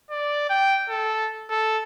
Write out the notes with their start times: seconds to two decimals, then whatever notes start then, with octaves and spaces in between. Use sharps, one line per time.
0.10 D5
0.50 G5
0.89 A4
1.51 A4